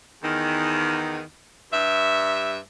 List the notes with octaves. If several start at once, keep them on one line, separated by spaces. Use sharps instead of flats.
E2 D#3
G2 E5